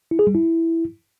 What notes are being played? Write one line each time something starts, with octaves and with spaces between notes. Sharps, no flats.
E4
G#4
G3
E4